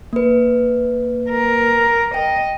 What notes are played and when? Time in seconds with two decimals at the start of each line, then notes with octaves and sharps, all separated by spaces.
0.13 A#3 B4
1.30 A#4
2.14 D#5 G5